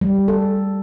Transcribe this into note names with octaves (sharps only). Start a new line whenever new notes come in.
G3
A4